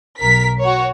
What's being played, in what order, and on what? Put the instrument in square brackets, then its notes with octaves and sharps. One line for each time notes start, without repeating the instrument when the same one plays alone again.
[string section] B1 A#4 B6
F#4 C#5